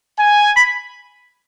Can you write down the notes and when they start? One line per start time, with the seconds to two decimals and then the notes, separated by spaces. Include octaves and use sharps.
0.17 G#5
0.56 B5